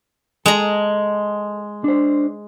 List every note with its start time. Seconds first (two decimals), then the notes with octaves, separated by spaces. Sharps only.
0.46 G#3 A4 A#5
1.84 D4 C5